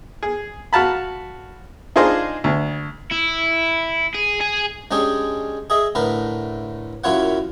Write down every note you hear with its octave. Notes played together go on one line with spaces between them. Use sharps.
G#4
F#4 F5 A5 B5
D4 D#4 F4 G#4 C5 D#5
D2
E4
G#4
G#4
G#3 C#4 D4 G4 G#4
G#4 D#5 E5
A2 D3 A#4 B4
F#2 A#2 E4 F4 C#5 F#5